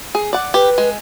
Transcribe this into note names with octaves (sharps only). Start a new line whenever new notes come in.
G#4
D5 F#5
G4 B4
G#3